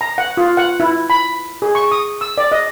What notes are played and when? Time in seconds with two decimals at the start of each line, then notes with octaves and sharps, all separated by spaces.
0.01 A#5
0.18 F#5
0.37 F4
0.57 F#5
0.80 E4
1.10 B5
1.62 G#4
1.75 C#6
1.92 D#6
2.21 E6
2.38 D5
2.52 D#5